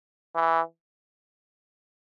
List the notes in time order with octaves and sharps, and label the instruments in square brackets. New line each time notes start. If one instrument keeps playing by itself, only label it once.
[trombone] E3